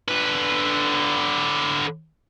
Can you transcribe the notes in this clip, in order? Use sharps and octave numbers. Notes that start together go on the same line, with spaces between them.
D3 B4